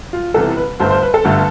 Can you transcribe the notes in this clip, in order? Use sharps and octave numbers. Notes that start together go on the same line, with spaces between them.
F4
C2 C3 E3 B3 A4
B4
G1 G2 D3 A3 C5
C5
B4
A4
G1 G2 D3 A3